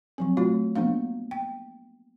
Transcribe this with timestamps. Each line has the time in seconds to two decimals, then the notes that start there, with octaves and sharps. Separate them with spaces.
0.18 F3 F#3 C4
0.37 A3 F4 F#4 C#5
0.75 F3 A#3 B3 D4 F5
1.31 G5